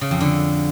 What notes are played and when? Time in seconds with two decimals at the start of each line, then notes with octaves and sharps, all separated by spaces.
0.01 C#3
0.11 F2
0.21 D3